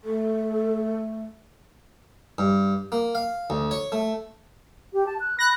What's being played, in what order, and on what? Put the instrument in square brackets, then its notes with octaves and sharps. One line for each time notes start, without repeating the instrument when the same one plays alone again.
[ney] A3 [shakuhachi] A4
[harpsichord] G2
A#3
F5
D2
C#5
A3
[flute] G4
A5
F#6
[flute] B5 [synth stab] F#6 A#6